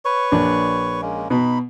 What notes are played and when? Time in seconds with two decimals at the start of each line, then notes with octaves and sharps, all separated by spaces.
0.05 B4 C#5 C#6
0.32 A#1 D4
1.02 G#3 A#3 C#4
1.30 B2 D#4 B5